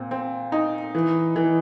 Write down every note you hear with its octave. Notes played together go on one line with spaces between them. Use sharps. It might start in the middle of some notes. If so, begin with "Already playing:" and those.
Already playing: A#2 C4
C4
D#4
E3
E3